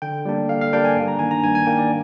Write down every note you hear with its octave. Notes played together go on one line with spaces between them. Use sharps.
D3 G5
G3 A#3 D4
D3 F5
F5
G3 A#3 D4 G5
G#5
G2
A#5
D#3 A#3 D4 G#5
A#5
G2 G#5
G#5
D#3 A#3 D4 G5
D5